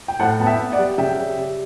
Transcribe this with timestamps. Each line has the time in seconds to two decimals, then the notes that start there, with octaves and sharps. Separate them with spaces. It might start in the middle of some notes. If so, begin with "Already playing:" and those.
0.08 G5
0.20 A2 F#5 A5
0.40 B3 A5
0.46 E5 G5
0.59 B3
0.72 D5 F#5
0.79 G3
0.98 C#3 E5 G5
1.19 G3
1.38 G3